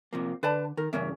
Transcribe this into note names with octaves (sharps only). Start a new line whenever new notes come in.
C3 F3 A#3
D3 B4 D5 A5
D#3 A#4
E2 G2 C#3 C#4 A#4 E5